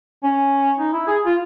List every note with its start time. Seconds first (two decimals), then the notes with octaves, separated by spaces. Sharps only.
0.23 C#4
0.79 D#4
0.93 E4
1.07 G#4
1.26 F4